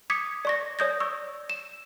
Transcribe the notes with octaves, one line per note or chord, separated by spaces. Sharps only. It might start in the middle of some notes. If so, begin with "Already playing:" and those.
D6 D#6 G#6 B6 C#7
D5 C#6 A#6
C#5 D5 D#6 G6 G#6 A#6
C#6 E6
E7